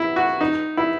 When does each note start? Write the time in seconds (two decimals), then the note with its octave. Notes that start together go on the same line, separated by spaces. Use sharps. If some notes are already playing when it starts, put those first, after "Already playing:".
Already playing: E4
0.16 F#4
0.41 D#4
0.77 E4